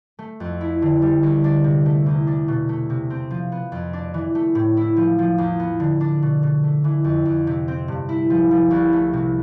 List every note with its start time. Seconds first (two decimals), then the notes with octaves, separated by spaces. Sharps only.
0.19 A3
0.40 F2
0.61 E4
0.82 D3
1.02 G3
1.23 D2
1.44 D4
1.64 C3
1.86 A3
2.06 E2
2.27 D4
2.48 B2
2.69 A3
2.90 C3
3.10 C4
3.31 F3
3.52 B3
3.72 F2
3.93 D4
4.14 E3
4.35 A3
4.55 A2
4.77 E4
4.97 F3
5.18 F3
5.38 E2
5.60 B3
5.80 D3
6.01 D4
6.23 B2
6.43 B2
6.64 A3
6.84 E3
7.04 F2
7.25 F2
7.47 C3
7.68 C4
7.88 G2
8.09 E4
8.30 F3
8.51 F3
8.71 C2
8.93 A3
9.13 C3